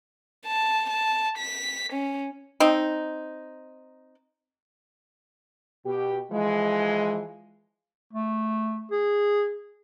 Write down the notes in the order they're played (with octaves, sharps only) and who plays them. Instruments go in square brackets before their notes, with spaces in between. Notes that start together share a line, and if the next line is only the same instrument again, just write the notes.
[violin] A5
A5
B6
C#4
[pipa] C4 D#4
[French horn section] B2 G4
E3 F3 G#3
[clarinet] A3
G#4